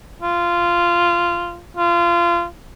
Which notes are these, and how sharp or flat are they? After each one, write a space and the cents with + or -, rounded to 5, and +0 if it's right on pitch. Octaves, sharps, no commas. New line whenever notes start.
F4 -15
F4 -25